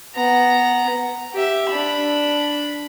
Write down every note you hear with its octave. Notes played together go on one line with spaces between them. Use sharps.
B3 A#5
G4 E5
D4 B5